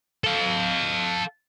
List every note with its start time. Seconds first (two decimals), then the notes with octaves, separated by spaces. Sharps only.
0.24 A4 F5